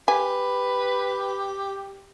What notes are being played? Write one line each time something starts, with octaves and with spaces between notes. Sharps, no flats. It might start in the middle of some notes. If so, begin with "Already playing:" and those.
G4 B4 G#5